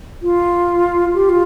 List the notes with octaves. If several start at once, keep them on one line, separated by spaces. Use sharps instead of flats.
F4
G4
F4